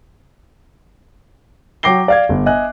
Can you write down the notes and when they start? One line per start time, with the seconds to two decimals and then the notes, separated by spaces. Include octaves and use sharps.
1.83 F#3 G5 D6 A#6 C7 G7
2.08 D5 F5 G#6
2.29 G1
2.46 D#5 E5 G#5 F#6